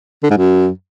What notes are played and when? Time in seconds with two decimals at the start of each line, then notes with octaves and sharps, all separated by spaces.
0.23 D3
0.30 G#2
0.37 F#2